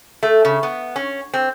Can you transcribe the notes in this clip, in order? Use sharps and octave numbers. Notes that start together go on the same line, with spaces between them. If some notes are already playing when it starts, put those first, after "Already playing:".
A3
C#3
B3
C#4
C4